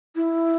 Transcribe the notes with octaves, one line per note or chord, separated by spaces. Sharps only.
E4